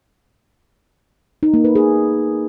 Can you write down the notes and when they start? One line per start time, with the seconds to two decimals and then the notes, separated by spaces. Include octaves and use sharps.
1.43 D#4
1.54 A#3
1.65 B4
1.75 G#4